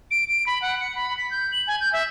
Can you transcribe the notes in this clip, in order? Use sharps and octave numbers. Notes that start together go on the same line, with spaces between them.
D7
D7
B5
F#5
C#7
B5
B6
G6
F#7
G#5
G6
E5